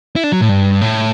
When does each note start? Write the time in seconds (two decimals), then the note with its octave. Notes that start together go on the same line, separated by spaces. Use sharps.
0.16 E4
0.24 D4
0.32 F#3
0.41 A2
0.49 G2
0.81 A2